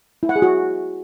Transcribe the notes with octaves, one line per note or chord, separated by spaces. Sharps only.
E4
F#5
G#4
F#4